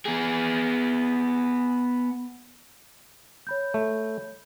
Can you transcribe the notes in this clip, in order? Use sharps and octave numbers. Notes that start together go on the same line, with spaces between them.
B3 G#4
C#5 B5 G6
A3